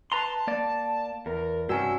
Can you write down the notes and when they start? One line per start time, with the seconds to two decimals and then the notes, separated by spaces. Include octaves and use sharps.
0.12 B4 A5 A#5 C6
0.47 A#3 D5
1.26 E2 A#4
1.69 G2 C3 C#4 F#4 G#5 E6